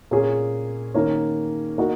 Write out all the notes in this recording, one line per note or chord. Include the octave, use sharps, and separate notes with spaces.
A#2 A#3 C#4 G#4
D#3 A#3 C#4
A#3 D#4 F#4